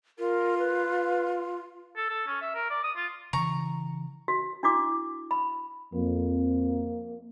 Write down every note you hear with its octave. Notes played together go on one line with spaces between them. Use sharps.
F4 A#4
B4
A4
A4
C#4
E5
A#4
D5
D#6
F4
C#3 E3 A#5 C#6
F#4
D4 E4 F#4 D6
B5
F2 A#3